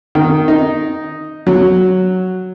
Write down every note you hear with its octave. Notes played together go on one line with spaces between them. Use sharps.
D#3
D#4
F#3